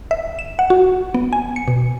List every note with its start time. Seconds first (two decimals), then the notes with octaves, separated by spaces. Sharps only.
0.11 E5
0.39 E7
0.59 F#5
0.70 F#4
1.14 B3
1.33 G#5
1.56 C#7
1.68 B2